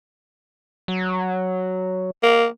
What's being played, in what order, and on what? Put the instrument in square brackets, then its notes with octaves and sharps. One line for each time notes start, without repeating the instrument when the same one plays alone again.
[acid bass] F#3
[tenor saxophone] A#3